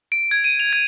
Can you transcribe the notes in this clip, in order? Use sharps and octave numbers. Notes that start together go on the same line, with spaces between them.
D7
G#6
D#7
F7
G#6